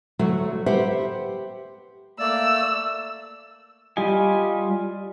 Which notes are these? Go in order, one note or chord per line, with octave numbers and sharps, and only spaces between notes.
D2 F#3 A3 F#4
G4 B4 C5 E5 F#5 G5
A3 A#3 D5 E6
G3 F4 G4 D#5 G#5